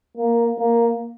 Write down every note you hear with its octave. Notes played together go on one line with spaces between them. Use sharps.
A#3
A#3